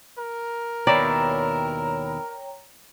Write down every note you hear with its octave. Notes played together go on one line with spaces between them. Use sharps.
A#4
D#2 B2 E4 C#5 D5 G5 A#5